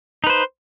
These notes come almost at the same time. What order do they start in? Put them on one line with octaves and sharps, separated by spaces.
D#4 B4 C5